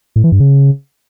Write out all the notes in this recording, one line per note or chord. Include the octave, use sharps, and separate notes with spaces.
A2
E3
G2
C#3